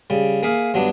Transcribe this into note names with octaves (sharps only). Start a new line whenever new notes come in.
C#3 G3
A#3 G#4 E5 F5
G2 F#3 B3 D4